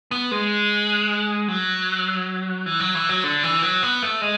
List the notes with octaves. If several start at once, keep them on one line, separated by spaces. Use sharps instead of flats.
B3
G#3
F#3
E3
F#3
E3
F#3
D3
E3
F#3
B3
A3
G#3